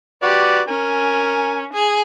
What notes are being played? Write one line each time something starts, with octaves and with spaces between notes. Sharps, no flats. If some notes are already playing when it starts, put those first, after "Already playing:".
F#4 G4 B4 D5
C#4 A#4 G#5
G#4